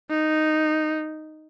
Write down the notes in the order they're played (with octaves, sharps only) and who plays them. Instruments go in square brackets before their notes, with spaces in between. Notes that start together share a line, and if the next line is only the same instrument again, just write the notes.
[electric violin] D#4